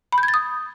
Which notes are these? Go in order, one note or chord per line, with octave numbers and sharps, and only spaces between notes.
B5
G6
G#6
A6
D#6